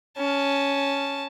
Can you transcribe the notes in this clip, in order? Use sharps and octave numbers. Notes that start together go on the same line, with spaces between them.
C#4 A5